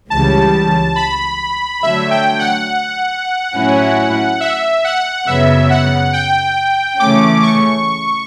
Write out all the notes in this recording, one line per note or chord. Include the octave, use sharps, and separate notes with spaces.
C#2 C#3 E3 G3 A5
B5
D3 F#3 A3 E5
G5
F#5
A2 F#3 C#4 E4
E5
F#5
F#2 C#3 F#3 B3 E5
F#5
G5
C#3 E3 A3 C#4 D6
C#6